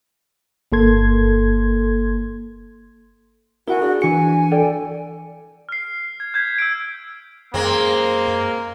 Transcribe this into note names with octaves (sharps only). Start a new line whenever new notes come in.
G1 A#3 A4 C6 G#6
E4 F#4 A#4 F#5 G#5
D4 G#4 D5
E3 D4 F#4 G#5 C#7
A4 D5 G5
F6 C7
G#6
G6 G#6 B6
E6 G6 D7
F#2 G#3 A#3 C4